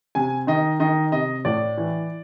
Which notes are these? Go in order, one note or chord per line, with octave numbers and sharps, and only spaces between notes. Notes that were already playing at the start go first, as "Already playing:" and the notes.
C3 G#5
D#3 D#5
D#3 D#5
C3 D#5
A2 D5
E3